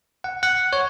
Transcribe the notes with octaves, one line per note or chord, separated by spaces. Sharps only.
F#5
F#5
C#5